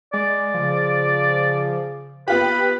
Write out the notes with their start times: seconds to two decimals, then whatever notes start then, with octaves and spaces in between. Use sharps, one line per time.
0.14 G#3 D5
0.54 C#3 F3
2.28 B3 F4 G4 B4 B5